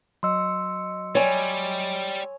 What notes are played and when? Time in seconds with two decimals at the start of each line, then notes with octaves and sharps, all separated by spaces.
0.23 F#3 D#5 C6 E6 C#7
1.15 G3 C#5 G#5